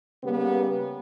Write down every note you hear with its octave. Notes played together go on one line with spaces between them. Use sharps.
C#3 G3 A#3 B3 G4